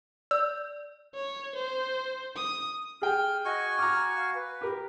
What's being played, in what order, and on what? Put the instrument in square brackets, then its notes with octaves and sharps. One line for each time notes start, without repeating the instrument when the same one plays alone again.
[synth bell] D5 [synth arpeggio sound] E6
[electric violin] C#5
C5
D#6
[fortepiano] G#4 G5 [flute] F6
[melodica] F#4 G#5 C#6 [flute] D#5
[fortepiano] A#5 D6 [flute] F6
[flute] F5
B4
[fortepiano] G4 A#4